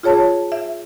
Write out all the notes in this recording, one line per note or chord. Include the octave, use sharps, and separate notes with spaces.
F4 G#4 C#5 A5
E5